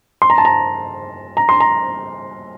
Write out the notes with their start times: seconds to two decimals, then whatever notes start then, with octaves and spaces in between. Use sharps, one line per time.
0.22 C6
0.30 A#5
0.38 A5
0.45 A#5
1.37 A#5
1.49 C6
1.60 A#5